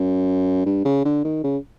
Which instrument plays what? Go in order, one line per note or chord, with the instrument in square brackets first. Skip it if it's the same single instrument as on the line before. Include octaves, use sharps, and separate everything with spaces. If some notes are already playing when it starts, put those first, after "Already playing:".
Already playing: [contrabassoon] F#2
G2
C#3
D3
D#3
C#3